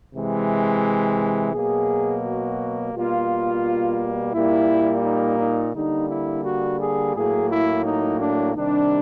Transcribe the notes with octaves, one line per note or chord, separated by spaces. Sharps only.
C3 E3 G#3
B2 F#3 A#3 G#4
F#4
B2 G3 A#3 F4
A#2 G3 A#3 E4
D#4
D#4
D3 G3 A#3 D#4
E4
F#4
G#4
A2 F#3 A#3 G#4
E4
D#4
D4
C3 D#3 G3 D4